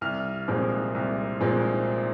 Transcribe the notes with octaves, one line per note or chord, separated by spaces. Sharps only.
C2 F6
A#2 F3 G#3 C4
C2
A#2 F3 G#3 C4